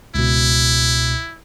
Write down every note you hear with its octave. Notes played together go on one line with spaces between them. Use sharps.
C#2 B2 E4